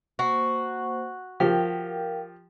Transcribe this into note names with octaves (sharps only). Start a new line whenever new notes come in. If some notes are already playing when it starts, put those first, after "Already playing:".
A#3 F#4 C5
F3 G4 A#4 F5 G5